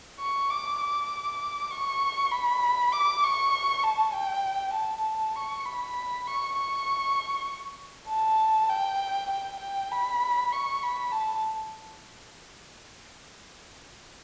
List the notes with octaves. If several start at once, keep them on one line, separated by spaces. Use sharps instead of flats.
C#6
D6
D6
C#6
B5
D6
C#6
A5
G5
A5
C#6
B5
C#6
C#6
A5
G5
G5
G5
B5
C#6
B5
A5